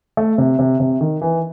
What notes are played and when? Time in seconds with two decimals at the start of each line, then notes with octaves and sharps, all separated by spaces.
0.17 A3
0.38 C3
0.59 C3
0.80 C3
1.01 D#3
1.22 E3